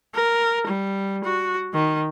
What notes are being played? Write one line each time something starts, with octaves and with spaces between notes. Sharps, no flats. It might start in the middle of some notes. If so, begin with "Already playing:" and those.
A#4
G3
F#4
D#3